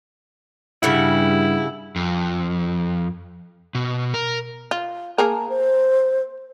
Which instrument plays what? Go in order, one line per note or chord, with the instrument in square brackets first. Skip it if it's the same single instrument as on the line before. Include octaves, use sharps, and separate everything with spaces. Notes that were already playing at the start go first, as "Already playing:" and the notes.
[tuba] G2 [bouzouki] C#3 G3 F#5 [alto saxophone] E4
[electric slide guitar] F2
B2
A#4
[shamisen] F4
[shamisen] A#3 G#4 A#4 [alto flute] A5
[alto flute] C5